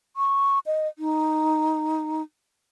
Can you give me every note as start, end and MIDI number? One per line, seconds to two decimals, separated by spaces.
0.17 0.59 85
0.66 0.88 75
0.99 2.22 63